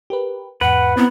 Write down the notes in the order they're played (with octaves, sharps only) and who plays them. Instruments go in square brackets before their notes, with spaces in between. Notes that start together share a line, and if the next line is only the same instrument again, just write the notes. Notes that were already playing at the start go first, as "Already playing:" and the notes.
[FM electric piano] G4 A#4 B4
[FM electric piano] E2 G#2 [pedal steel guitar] B4 [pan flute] F#5
[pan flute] B3 [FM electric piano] C4 E4 A#5